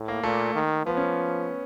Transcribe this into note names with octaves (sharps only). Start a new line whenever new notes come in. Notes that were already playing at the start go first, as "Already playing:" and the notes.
Already playing: A2
A#3
A#2 A3
D#3
F3 B3
C#4